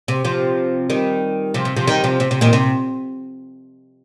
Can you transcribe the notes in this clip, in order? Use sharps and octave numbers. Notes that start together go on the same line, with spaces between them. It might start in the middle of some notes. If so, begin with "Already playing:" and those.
C3
C3 F3
D#3 G3
C3 F3
C3
C3 F3
D#3 G3
C3 F3
C3
C3
A#2 D#3
C3